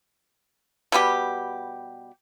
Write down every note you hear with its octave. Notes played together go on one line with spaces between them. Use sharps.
B2 G3 B3 G4